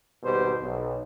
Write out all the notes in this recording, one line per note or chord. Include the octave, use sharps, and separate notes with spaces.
G#1 B2 G3 G4 C5
B1